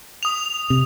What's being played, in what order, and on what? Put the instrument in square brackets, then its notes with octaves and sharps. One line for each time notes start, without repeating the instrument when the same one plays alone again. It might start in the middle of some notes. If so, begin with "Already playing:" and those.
[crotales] D#6 F7
[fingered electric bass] C3